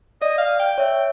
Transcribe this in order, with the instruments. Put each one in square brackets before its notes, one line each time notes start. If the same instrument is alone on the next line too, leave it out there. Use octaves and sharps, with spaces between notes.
[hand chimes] D5 [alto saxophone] D#5
[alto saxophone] F5
G5
[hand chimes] C#5 E5